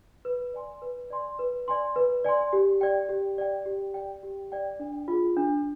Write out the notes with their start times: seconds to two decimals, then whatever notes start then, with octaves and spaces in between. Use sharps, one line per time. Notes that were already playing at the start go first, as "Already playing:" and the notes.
0.25 B4
0.54 D5 G#5 C6
0.82 B4
1.10 D5 G#5 C6
1.39 B4
1.68 D5 G#5 C6
1.96 B4
2.24 D5 G#5 C6
2.53 G4
2.81 D5 G5
3.09 G4
3.38 D5 G5
3.66 G4
3.94 D5 G5
4.23 G4
4.52 D5 G5
4.80 D4
5.08 F4 G#4
5.37 D4